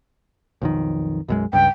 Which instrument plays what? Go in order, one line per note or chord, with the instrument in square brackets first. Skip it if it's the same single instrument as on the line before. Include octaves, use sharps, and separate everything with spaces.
[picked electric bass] B1 F2 D#3
B1 F#2 G#3
[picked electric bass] C#2 G2 [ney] G5